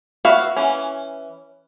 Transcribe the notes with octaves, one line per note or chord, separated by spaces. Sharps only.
F#4 B4 E5 F5
E3 C#4